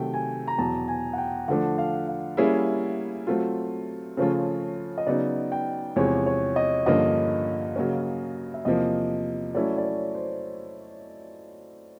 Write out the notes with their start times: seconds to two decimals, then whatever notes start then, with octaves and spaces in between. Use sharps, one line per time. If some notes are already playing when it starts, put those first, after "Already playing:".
Already playing: C3 D#3 F#3 A3 G5
0.14 G#5
0.47 A#5
0.58 E2 B2 F#3 A5
0.88 G#5
1.13 F#5
1.18 G5
1.48 D3 F3 A3 D4 F#5
1.78 F5
2.08 F5
2.37 G3 A#3 C#4 E4 G#4 E5
3.27 F#3 A3 C4 F4
4.17 C#3 F3 A3 C#4 F4 C#5
4.98 D#5
5.07 C#3 F#3 B3 D#4 D5
5.52 G5
5.96 E2 C3 F3 G#3 C#5
6.26 C#5
6.56 D#5
6.86 G2 D3 F3 A#3 C#4 D#5
7.76 C#3 F#3 A#3 C#4
8.54 E5
8.65 E2 C3 F3 A#3 D#5
9.55 F#3 A3 C#4 E4 D5
9.78 D5
9.85 C#5
10.14 C5